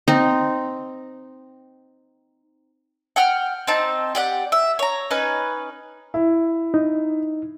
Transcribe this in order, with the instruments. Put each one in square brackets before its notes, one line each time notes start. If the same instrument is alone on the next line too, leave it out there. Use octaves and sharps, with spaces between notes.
[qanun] C4 D#4
[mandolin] F#5 G5 F6
C4 D#4 A5
G4 D5 F#5
E5
C#5 A#5
C#4 D#4 B4
[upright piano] E4
[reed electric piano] D#4